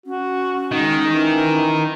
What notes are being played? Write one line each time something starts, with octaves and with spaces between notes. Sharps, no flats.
C#4 F#4
D#3 G#3
E3